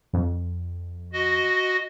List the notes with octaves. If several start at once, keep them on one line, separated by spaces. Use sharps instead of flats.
F2
F#4 D#5